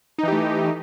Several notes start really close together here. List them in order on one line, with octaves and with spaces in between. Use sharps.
D#4 E3 G4 A3